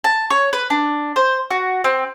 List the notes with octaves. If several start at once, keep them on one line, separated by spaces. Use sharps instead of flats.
A5
C#5
B4
D4
C5
F#4
C4